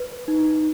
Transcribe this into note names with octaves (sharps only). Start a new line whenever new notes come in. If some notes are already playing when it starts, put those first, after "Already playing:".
Already playing: B4
D#4